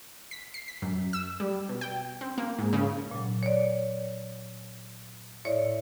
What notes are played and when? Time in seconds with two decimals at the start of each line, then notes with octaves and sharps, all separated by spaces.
0.31 B6
0.54 C7
0.68 B6
0.82 F#2
1.13 E6
1.40 G3
1.69 B2
1.81 G5
2.21 C4
2.38 A#3
2.59 G#2
2.73 C#3
3.11 A#2 F#3
3.43 C#5 D5
5.45 A2 E4 C#5 D5 E5